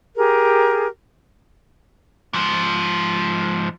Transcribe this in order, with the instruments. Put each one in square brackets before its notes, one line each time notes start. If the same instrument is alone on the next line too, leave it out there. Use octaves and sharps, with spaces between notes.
[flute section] G4 G#4 A#4
[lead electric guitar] G#2 F3